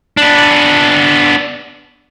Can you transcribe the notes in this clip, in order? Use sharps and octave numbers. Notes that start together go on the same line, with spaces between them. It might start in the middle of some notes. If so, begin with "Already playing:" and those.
B3 D4